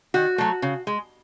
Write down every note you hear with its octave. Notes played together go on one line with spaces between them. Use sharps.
D#3 F#4
F#3 A3
C#3
G#3